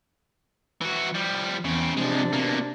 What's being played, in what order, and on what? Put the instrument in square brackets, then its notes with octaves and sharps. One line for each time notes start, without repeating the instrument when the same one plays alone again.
[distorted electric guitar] E3 F#4
F3 G3
[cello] E2 [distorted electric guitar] C#3 C4
[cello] C3 D4 [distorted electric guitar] F3 G#3
[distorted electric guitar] B2 A#3